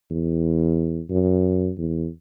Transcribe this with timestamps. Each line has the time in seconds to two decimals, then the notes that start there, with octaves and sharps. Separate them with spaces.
0.10 E2
1.10 F#2
1.78 E2